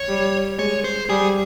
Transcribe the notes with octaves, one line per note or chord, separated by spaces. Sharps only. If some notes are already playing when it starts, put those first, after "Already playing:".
Already playing: C#5
G3
G#3 C#5
C5
G3 G#4